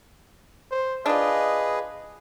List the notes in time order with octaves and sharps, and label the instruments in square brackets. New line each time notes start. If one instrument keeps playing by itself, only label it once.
[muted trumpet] C5
[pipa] D4 F4 [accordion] G#4 B4 [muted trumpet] D#5